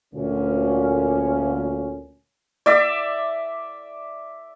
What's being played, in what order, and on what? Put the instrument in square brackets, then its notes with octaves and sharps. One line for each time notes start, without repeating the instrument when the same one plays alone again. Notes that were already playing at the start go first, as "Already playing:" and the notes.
[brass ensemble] D2 A#2 C#4
[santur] D5 E5 D6